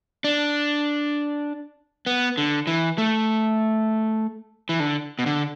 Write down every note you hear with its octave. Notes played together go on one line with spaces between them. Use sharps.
D4
B3
D3
E3
A3
E3
D3
B2
D3